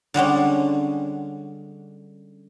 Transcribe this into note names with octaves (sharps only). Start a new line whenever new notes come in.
D3 G3 G#3 C#4